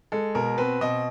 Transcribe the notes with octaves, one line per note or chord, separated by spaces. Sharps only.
G#3 A4
B2 A#4
C4 B4
B2 D#5